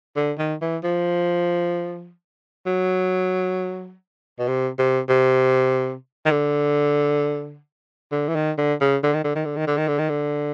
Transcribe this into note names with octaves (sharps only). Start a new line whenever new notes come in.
D3
D#3
E3
F3
F#3
B2
C3
C3
C3
D#3
D3
D3
E3
D#3
D3
C#3
D3
D#3
D3
D#3
D3
D#3
D3
D#3
D3
D#3
D3